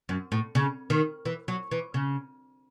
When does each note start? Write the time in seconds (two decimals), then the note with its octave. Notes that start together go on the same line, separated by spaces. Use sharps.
0.09 F#2
0.32 A2
0.55 C#3
0.90 D#3
1.25 E3
1.48 F#3
1.71 E3
1.94 C#3